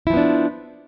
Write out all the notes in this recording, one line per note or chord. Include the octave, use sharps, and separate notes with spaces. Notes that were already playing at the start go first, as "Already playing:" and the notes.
F3 B3 D4 E4